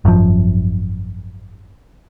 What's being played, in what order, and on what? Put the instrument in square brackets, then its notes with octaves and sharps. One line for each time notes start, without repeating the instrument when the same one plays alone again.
[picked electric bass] G#1 F#2 A2 F3